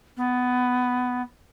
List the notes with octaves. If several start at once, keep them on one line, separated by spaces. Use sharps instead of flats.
B3